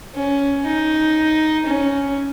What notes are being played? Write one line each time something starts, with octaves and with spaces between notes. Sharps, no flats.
C#4
D#4
C#4